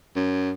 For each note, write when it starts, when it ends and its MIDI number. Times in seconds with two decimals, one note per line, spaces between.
0.16 0.52 42